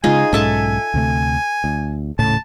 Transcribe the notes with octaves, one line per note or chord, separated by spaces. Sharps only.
C#3 G#3 D#4 F4 G#4 G#5
B1 G#2 C#4 A4 E5 A5
D2 C3 A3
D2
D#1 A2 C#3 A5